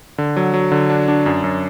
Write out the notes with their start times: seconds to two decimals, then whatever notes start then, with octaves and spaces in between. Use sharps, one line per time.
0.18 D3
0.36 F#3
0.54 F#3
0.72 D3
0.90 D4
1.08 D4
1.26 F#2
1.44 F#2